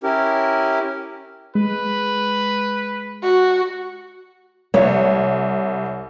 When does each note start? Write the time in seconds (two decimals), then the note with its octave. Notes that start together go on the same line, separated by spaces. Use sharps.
0.03 C#4 E4 G4 A#4
1.55 G#3 B4
3.24 F#4
4.74 C2 C#5